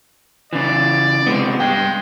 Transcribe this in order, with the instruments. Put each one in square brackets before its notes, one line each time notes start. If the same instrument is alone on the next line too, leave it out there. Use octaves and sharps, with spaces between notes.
[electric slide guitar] C#3 E3 [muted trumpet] D5
[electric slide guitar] C3 G#3 B3
[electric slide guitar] G2 G5 [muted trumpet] G#3